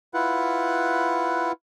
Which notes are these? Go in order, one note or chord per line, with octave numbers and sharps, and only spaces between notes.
E4 F4 B4 F#5